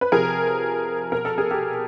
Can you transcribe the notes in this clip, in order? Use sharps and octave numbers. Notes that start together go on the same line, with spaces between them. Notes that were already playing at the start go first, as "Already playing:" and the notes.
B4
C3 F3 G#4 A#4
B2 A#4
A4
G#4
G4 A4